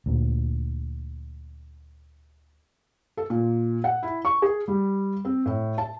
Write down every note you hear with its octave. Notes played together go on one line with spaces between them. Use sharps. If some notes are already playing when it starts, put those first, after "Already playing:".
D2 A#2
A4
A#2
F#5
E4
C#6
G#4
G3
C4
A2
A5